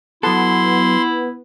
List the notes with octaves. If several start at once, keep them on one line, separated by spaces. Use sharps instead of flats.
F#3 B3 E4 A4 C6